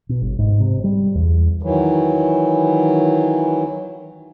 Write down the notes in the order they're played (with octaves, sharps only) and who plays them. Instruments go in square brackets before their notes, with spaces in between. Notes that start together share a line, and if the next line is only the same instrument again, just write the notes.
[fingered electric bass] B2
G1
G#2
C3
G3
E2
[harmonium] D#3 E3 F#3